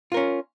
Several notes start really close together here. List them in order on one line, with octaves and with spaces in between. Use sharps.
F4 A#4 C#4